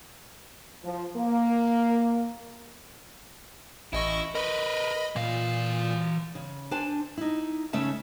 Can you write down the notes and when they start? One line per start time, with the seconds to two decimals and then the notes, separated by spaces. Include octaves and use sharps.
0.84 F3
1.16 A#3
3.93 A1 E4 D#5 C#6
4.35 A#4 B4 D#5 B5
5.16 A#2 E3 F5
6.35 C#3
6.71 D4 C5 G#5 A5
7.17 D#4 E4
7.73 C#3 A3 C#4 E5 A5